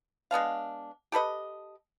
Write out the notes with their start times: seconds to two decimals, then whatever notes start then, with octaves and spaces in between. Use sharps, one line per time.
0.31 G#3 B3 D4 F5
1.12 G4 A4 B4 D#5